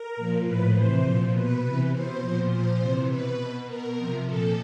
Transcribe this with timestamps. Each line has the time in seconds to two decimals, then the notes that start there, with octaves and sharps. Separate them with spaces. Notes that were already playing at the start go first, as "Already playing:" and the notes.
Already playing: A#4
0.16 A#2 F3
0.45 A2 F3 B4
0.74 C3 E3 C5
1.03 A#2 F3
1.33 B2 B4
1.62 C3
1.67 E3
1.91 B2 C5
2.20 A#2 F3
2.49 A#2 F3 C5
2.79 C3 E3
3.07 B2 B4
3.37 B2
3.66 B2 A#4
3.96 C3 F3
4.25 A#2 F3 A4